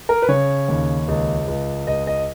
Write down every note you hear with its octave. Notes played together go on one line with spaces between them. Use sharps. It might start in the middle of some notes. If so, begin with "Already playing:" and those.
A#4
B4
C#3 C#5
D#2
C#2
C#2
C#2 D#5
D#5